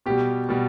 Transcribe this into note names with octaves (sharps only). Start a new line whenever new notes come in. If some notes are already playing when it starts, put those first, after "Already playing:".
B2 G3 G4
B2 G3